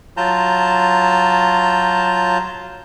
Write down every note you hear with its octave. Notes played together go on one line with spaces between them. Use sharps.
F#3 F4 A5 A#5 G6